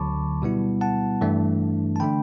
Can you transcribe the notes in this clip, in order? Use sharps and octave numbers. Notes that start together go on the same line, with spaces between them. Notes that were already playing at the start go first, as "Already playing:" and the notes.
Already playing: D2 D3 F#3 A5 B5 C#6 D6
B2 G3 B3 E4
F#5 A5
G2 E3 A3 D4
A5
D3 A3 D4 G5 B5